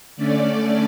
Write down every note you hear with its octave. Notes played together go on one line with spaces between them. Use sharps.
D3 A3 C#4 D5